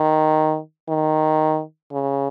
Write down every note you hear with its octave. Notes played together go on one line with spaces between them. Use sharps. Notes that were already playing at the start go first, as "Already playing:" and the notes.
Already playing: D#3
D#3
C#3